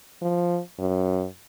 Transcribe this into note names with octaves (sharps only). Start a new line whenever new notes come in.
F3
F#2